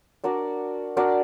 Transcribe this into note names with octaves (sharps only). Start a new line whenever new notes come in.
D4 F#4 A#4 D5
D4 F#4 A#4 D5